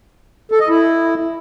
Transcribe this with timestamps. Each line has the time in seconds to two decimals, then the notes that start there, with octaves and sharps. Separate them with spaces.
0.51 A4
0.60 D#5
0.69 E4